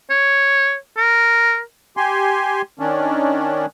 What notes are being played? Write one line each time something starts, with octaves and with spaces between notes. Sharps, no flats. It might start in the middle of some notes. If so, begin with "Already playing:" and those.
C#5
A#4
G4 G#5 C6
D#3 C#4 D4